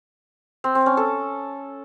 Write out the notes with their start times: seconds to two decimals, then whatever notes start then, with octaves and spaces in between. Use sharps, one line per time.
0.64 C4
0.75 C4
0.86 C#4
0.97 A4